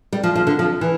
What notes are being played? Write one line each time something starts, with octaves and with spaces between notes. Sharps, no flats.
G3
F3
F3
D3
F3
E3